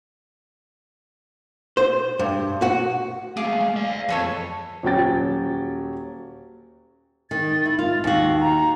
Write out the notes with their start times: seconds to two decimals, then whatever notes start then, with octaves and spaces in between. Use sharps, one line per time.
1.77 C5
2.19 G2
2.62 F#4
3.37 G#3 A3 G#4 F5 D6
3.76 D5 E5
4.09 F2 G#4 A4 C#5
4.83 D#1 F#3 C#4 G5 A6
7.31 D#3 A6
7.65 E4
7.79 F4 A6
8.04 D#2 F#4 F5
8.40 A#5